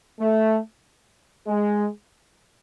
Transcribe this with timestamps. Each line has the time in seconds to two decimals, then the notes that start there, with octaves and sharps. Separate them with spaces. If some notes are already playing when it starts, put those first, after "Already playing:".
0.20 A3
1.48 G#3